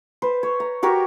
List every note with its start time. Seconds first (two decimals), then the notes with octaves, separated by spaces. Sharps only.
0.22 B4 C5
0.43 C#5
0.60 A#5
0.83 F#4 G4 A#4 C#5